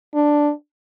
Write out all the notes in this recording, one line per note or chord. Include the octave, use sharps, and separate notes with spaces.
D4